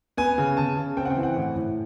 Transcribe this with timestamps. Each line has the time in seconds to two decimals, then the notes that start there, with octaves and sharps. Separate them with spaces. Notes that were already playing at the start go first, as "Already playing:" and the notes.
0.17 B3 G#5
0.38 C#3
0.57 C#3 A5
0.77 C#3
0.97 C4 G5
1.05 F#5
1.10 G5
1.16 E3
1.23 F#5
1.36 A2
1.56 A2